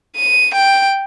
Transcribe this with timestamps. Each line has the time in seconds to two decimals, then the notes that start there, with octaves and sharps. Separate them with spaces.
0.16 D#7
0.55 G5